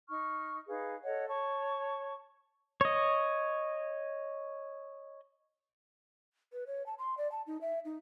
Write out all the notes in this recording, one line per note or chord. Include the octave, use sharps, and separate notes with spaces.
D#4 C#6 F6
D#4 G#4 B4 F5
A4 C#5 D#5 F#5
C#5 A5 C#6
C#5 D#5
B4
C#5
A5
C6
D5
A5
D#4
E5
D#4